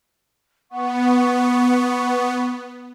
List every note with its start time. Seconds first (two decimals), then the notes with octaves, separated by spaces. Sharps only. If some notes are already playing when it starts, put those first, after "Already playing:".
0.71 B3 F#5 C#6